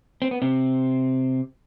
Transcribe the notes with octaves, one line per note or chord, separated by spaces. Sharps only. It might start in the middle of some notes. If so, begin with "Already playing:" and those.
C4
B3
C3 C4